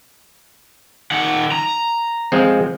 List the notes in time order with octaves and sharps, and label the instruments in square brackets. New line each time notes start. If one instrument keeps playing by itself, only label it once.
[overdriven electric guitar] D#3 F#5
A#5
[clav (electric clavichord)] F3 G#3 C4